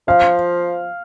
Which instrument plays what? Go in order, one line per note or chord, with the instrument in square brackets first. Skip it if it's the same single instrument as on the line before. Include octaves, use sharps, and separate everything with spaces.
[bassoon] F3 [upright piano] F5